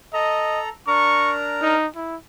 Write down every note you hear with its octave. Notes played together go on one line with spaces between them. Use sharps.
A4 D#5 A#5
D4 A#4 A#5 C#6
D#4
E4